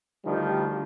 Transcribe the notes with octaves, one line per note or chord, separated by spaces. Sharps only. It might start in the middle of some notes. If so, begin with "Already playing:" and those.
D2 D3 D#3 F3 G3